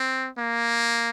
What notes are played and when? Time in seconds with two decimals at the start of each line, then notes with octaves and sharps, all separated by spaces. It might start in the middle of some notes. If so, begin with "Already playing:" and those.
Already playing: C4
0.38 A#3